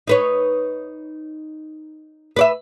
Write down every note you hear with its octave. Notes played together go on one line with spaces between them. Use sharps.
D#4 B4 C#5
B4 D5 E5